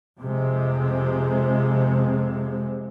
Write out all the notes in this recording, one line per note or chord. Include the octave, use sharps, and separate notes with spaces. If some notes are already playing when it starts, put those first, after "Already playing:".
F2 C3 G#3